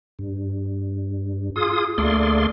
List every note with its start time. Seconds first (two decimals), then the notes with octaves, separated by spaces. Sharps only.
0.19 G2
1.56 F4 G#4 D#6
1.98 D2 A3 A#3 G#4 D5 C6